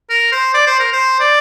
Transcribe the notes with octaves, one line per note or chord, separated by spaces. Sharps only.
A#4
C5
D5
C5
A#4
C5
D5